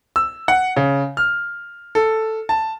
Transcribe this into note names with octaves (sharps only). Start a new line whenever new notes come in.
E6
F#5
C#3
F6
A4
A5